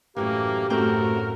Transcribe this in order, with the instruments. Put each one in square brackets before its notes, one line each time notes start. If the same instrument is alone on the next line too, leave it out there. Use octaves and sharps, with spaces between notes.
[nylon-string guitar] F#2 A2 E3 [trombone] A#3 [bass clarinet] G4
[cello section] F#2 A2 F#4 [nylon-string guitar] A3 C4 G5 [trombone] A#4